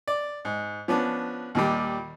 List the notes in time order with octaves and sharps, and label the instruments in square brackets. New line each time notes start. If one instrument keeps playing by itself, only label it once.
[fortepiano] D5
G#2
F3 B3 C#4 D4
D#2 A#2 G3